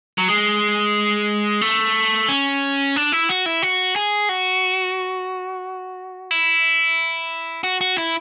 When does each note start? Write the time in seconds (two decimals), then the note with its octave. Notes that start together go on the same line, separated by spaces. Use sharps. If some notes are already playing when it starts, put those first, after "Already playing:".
0.18 F#3
0.28 G#3
1.61 A3
2.28 C#4
2.96 D4
3.12 E4
3.29 F#4
3.46 E4
3.62 F#4
3.96 G#4
4.29 F#4
6.31 E4
7.64 F#4
7.81 F#4
7.98 E4